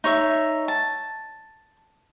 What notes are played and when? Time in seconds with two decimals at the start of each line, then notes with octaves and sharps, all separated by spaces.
0.04 D#4 C#5 E5
0.68 A5